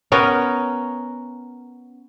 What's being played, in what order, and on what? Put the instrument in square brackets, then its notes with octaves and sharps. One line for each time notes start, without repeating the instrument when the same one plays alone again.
[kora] B3 C#4 A#4